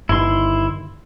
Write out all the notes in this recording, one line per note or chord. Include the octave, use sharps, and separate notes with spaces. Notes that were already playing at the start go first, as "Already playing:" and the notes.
G1 D#3 E4 C6